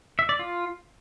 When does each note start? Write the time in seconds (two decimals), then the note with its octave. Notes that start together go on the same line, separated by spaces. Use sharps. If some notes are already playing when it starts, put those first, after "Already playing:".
0.19 E5
0.29 D5
0.39 F4